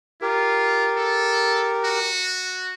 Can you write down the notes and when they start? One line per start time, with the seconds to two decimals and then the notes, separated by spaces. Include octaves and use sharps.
0.22 F4 G4 A#4
0.97 A4
1.84 F#4